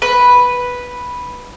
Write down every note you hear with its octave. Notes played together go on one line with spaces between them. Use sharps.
B4